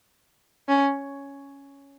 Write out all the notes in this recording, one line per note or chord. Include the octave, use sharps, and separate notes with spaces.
C#4